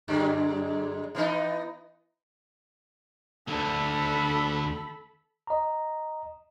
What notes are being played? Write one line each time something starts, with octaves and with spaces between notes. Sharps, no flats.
F#2 D3 G#3
E3 B3 D#4
D2 D3 A4 B5
D#5 A#5